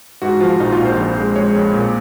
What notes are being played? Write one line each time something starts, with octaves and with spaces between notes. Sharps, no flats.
G#2 F#4
F3 F4
A#1 D#4
F4
A#1
C5
F2
G#3
G#3 C#5
F2
A#2